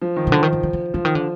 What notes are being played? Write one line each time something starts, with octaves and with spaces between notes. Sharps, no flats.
F3
D#3
C3
D3 F3
D#3
D3
D3
D3
D3 F3
D#3
D3